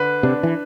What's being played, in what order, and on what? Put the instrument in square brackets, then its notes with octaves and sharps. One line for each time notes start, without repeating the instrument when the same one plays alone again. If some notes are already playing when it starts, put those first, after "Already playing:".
Already playing: [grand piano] D3 B4
[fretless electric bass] C3 [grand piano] D4
[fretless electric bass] E3